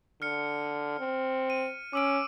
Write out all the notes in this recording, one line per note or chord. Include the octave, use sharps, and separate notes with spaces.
D3 F6 C#7
C4
D#7
C#4 D6 E6 D7